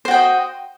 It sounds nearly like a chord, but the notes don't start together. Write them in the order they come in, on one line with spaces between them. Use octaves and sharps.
C5 F#4 G5 D#5